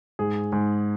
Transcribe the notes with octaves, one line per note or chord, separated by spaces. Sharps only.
G#2 G#4
G#2